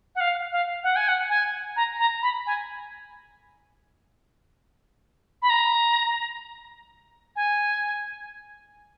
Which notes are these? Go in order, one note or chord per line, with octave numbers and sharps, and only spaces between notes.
F#5
F5
F5
F#5
G#5
F#5
G#5
A#5
A#5
B5
G#5
B5
A#5
G#5